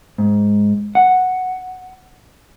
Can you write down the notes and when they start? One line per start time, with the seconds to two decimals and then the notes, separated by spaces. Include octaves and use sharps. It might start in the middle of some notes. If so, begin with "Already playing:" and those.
0.18 G#2
0.95 F#5